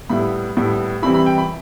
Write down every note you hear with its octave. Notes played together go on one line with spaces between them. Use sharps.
A2 G3 B3 E4 B5
A2 G3 B3 E4
C3 E3 G3 C4 E4 B5
B5
G5
B5